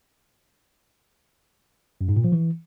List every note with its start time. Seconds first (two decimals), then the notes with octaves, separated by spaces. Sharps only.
2.01 F#2
2.09 G#2
2.16 A#2
2.24 F3
2.32 E3